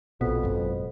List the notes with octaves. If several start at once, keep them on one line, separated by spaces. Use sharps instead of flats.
A#1 F2 B2
G#1 F#2